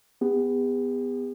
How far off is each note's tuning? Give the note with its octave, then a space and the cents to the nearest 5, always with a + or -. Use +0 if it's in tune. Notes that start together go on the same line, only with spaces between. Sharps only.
B3 +15 G#4 -45